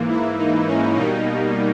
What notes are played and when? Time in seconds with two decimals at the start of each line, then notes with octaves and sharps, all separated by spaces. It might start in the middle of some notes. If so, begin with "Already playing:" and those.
Already playing: G#2 E3 A#3
0.09 E4
0.38 D#4
0.67 C#4
0.95 B2 G3 A#3 D#4